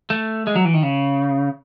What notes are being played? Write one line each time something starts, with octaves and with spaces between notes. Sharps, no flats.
A3
G#3
F#3
E3
D#3
C#3